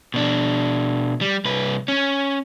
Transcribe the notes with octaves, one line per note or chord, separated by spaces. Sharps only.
B2 D4
G3
C2 B4
C#4